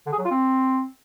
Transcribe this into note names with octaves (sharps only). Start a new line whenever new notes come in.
D3
G#4
F#3
F4
C4